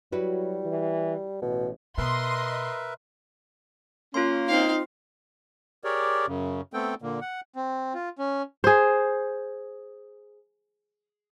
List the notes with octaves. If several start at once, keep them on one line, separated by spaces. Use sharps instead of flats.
F#3 G3 E4 F#4 B4
E3
A1 B2
B2 A#4 B4 D#5 E5 C6
A#3 C#4 F4 C6
C4 D#4 F5
G4 G#4 A#4 C#5 D5
F#2 C#3
A3 B3 C4 A4 G5
A#2 D3 A#3
F#5
C4
F4
C#4
G#4 C5